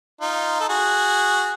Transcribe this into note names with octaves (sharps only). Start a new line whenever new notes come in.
D#4 F4
A4
F#4 G#4